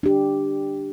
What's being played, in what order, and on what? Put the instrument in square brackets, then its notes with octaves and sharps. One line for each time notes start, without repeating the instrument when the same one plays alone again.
[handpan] D4 G4